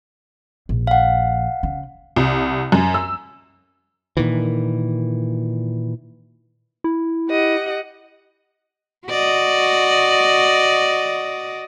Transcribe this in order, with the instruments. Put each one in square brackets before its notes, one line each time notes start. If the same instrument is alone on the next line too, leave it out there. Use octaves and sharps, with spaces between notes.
[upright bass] A#1
[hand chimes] F5 F#5
[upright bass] C#3
[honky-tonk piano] C2
F#2
E6
[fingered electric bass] A#2 D#3 E3
[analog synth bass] E4
[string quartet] G4 D#5 F#5
[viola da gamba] F#4 D5 D#5